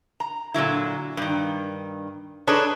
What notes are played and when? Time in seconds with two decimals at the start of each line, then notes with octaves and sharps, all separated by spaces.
0.20 A#5
0.54 A#2 D3 F#3 E4
1.17 G2 D#3
2.47 D4 D#4 G#4 A4 B4 C#5